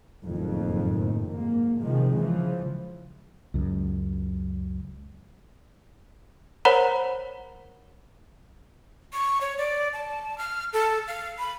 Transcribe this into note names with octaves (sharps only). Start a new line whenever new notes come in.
F#1 F2 A2 D#3
G#2 A#3
C3 D#3 F3 G#3
C#3 E3 F3
C#2 F#2
A#4 C5 C#5 F#5 A#5 B5
C#6
C#5
D5
A5
F6
A4
F5
B5